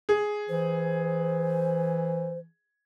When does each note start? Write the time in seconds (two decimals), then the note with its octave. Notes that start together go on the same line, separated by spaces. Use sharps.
0.09 G#4
0.49 E3 C5